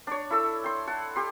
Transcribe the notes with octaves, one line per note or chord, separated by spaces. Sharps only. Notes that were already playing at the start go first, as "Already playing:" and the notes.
D4 C#5
E4 A4 E6
G5 C6
F#5 A5
G4 C6